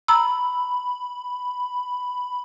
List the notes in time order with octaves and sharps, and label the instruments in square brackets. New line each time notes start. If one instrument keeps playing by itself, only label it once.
[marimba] A#5 E6 [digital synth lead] B5